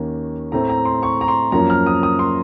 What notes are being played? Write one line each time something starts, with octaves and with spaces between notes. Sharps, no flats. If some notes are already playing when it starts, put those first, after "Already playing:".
Already playing: D#2 D#3 A#3 C#4
A2 A3 C4 A#5
A#5
C6
C#6
A#5
C6
F#2 F3 A#3 C#4 A#5
F6
D#6
D#6
C6